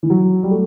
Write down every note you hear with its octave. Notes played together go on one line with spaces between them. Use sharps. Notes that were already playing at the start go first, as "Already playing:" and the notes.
E3
F#3
G3
A3